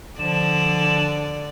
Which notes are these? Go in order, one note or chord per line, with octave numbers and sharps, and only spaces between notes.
D3 F3 D5 E7